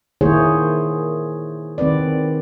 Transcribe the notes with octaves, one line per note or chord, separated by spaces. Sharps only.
D#3 A#3 E4 G#4 C5 C#5
D#3 C4 B4 D5